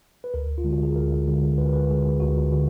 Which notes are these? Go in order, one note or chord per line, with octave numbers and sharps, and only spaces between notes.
B4
D2 A#4
F4
D3 G#3
F#4
G#4
D2 A#4
D3 G#3
D2 B4
A#4
B4
D3 G#3 G#4
D2 F#4
D3 F#4